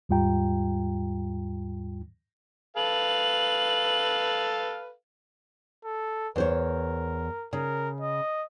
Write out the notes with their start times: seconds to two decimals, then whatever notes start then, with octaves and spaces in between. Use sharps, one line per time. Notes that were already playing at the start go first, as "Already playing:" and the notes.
0.09 D#2 G#2 G3 F4 G5 A#5
2.77 A4 B4 F5 F#7
5.85 A4
6.36 E2 A#4 C5 C#5
7.53 C#3 A#4
8.00 D#5